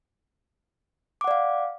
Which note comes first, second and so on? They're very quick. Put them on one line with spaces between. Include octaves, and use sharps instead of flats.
D6 F#5 D5 F5